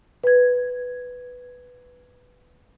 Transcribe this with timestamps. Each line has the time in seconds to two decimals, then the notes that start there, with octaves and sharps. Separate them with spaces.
0.24 B4 G#6